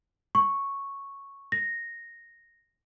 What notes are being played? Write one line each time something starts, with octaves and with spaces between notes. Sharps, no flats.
C#6
A#6